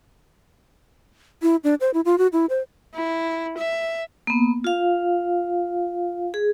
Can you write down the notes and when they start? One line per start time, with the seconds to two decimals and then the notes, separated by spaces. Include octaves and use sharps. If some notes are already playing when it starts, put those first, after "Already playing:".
1.42 E4
1.64 D4
1.81 C5
1.94 E4
2.05 F4
2.18 F#4
2.33 E4
2.50 C5
2.95 E4
3.57 E5
4.27 A#3 B3
4.64 F4 F5
6.34 G#4